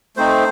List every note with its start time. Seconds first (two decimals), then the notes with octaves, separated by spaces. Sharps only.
0.17 A3 C4 D#4 C5